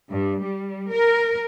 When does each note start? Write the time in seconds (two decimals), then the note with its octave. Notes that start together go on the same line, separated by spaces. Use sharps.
0.10 G2
0.42 G3
0.91 A#4